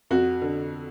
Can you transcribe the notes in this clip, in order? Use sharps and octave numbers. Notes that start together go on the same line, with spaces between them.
F2 F#4
D3